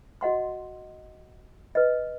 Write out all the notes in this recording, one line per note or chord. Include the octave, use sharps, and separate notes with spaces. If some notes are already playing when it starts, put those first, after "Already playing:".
F#4 D#5 F#5 C6
B4 D#5